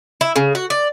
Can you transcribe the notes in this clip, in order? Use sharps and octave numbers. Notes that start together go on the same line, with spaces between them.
E4
C#3
F#4
D5